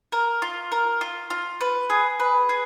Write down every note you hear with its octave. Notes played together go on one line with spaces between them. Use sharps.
A#4
F4
A#4
F4
F4
B4
G#4
B4
G#4